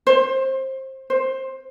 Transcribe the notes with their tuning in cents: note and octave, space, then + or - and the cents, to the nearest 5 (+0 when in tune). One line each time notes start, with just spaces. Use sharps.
C5 +20
C5 +15